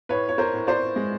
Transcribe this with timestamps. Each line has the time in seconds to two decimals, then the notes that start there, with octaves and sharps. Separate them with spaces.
0.09 A2 B4 C#5
0.29 C#5
0.38 A#4 C5
0.53 A2
0.67 C5 D5
0.96 G#3